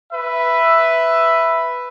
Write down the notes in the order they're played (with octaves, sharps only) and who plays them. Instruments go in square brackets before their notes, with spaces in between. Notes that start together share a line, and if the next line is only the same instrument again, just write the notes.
[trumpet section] B4 E5